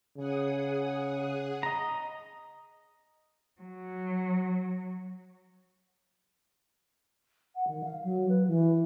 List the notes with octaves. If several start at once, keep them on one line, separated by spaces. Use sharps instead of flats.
C#3 G#4 F#5 D#6
D#5 A#5
F#3
F#5
D#3
F5
F#3
B4
E3